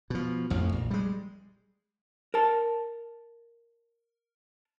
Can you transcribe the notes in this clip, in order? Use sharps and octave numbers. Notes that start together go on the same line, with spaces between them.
B2 F3
A1 F2 F3
A#1
G3 G#3
A#4 A5